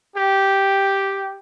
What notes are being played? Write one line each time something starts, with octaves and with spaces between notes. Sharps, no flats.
G4